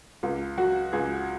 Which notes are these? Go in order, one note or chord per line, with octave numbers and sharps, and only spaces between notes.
C#2
F#3 F#4
C#2 G#4